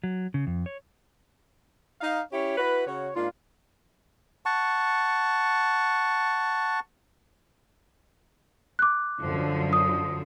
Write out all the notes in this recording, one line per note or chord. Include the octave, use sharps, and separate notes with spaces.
F#3
C#3
F2
C#5
D#4 F5
C#4 E4 G4 C#5
E4 F#4 B4
C#3 F#4 C#5
G#2 A#3 D4 F4
F#5 A5 C#6
D6 F#6
F#2 D3 F3
D#6